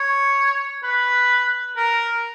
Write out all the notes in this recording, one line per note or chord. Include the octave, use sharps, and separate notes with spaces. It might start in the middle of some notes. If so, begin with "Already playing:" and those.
Already playing: C#5
B4
A#4